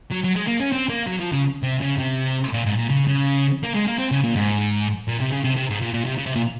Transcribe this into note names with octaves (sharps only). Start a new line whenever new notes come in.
F#3
F#3
G#3
A#3
C#4
C4
A#3
F#3
F3
C#3
C3
C#3
C3
A#2
G#2
A#2
C#3
C#3
A#3
G#3
A#3
C4
C#3
A#2
G#2
A#2
C3
C#3
C3
C3
G#2
A#2
A#2
C3
C#3
C3
A#2